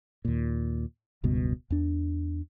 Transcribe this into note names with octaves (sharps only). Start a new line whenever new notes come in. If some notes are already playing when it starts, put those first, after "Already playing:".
D#2 A#2
E1 C#2 G2 B2
E2 D4